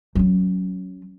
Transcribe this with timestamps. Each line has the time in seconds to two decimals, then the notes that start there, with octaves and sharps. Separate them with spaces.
0.15 F#3 C#4